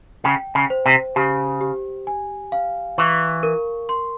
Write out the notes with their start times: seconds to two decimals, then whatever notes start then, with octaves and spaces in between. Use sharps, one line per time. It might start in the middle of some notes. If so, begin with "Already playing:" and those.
0.24 C#3 G5
0.55 C#3
0.70 C5
0.86 C3
1.16 C#3 G4
1.61 G4
2.07 G#5
2.52 F5
2.98 E3 C#6
3.43 A#4
3.89 C6